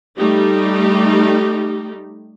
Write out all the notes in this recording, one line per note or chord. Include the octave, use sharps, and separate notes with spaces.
G3 A3 D#4 G4